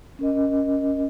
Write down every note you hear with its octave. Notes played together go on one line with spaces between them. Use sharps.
C#4 A#4 D#5